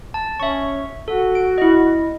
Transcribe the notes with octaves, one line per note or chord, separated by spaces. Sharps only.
A5
C#4 C#5 E5 C#6
F#4 A4
D7
E4 D#5